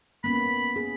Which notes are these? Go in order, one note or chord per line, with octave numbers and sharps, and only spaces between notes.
A#3 B3 C#4 B5
G#4